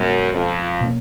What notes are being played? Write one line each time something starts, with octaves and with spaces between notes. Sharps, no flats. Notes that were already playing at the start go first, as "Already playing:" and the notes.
Already playing: F#2 B2 G#3 B3
F2
B2 A#3 C#4